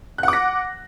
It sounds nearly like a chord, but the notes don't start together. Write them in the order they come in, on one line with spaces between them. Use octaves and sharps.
F#6 F#5 D6 A#6